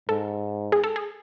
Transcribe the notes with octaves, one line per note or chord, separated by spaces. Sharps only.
G#2 A4
G#4
A4
G#4